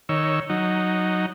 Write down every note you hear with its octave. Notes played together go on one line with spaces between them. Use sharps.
D#3 C#5 E6
F#3 D#4